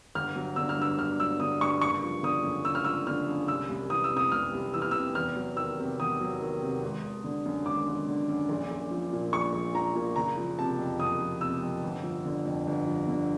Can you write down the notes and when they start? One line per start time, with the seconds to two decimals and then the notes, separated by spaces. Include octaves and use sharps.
0.15 G1 F6
0.36 F#3
0.56 D3 E6
0.69 F6
0.77 G2 E6
0.98 G1 F6
1.19 F#3 E6
1.40 D3 D#6
1.61 G2 C#6
1.82 F#1 C#6
2.03 F3
2.23 D3 D#6
2.44 F#2
2.65 F#1 E6
2.75 F6
2.84 F3 E6
3.07 D3 F6
3.27 F#2
3.48 C2 E6
3.69 C2
3.90 E3 D#6
4.04 E6
4.11 C3
4.17 D#6
4.32 C2 F6
4.53 C2
4.74 E3 E6
4.82 F6
4.91 C3 E6
5.15 E2 F6
5.36 F#3
5.57 D#3 E6
5.78 C3
6.00 E2 D#6
6.21 F#3
6.40 D#3
6.61 C3
6.82 G#1
7.03 G#1
7.24 D3
7.45 F#2
7.66 G#1 D6
7.87 G#1
8.08 D3
8.29 F#2
8.49 A#1
8.71 A#1
8.91 F3
9.13 A#2
9.32 A#1 C#6
9.53 A#1
9.74 F3 A#5
9.95 A#2
10.16 F#1 A#5
10.37 F3
10.58 C3 A5
10.79 F2
11.00 F#1 D#6
11.20 F3
11.41 C3 E6
11.62 F2
11.83 G1
12.03 F3
12.26 D3
12.45 F2
12.67 G1
12.87 F3
13.08 D3